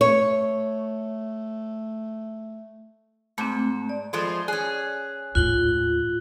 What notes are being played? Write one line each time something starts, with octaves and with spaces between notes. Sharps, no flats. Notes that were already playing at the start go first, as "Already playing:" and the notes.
A3 C#5
G#2 A3 C4
D5
F3 G#3 A3
C#4 G#4 F#6
D#2 A2 F4 F#6 F#7 G7